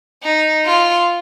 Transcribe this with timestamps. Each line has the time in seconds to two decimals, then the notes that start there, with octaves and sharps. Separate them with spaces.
0.23 D#4
0.65 F4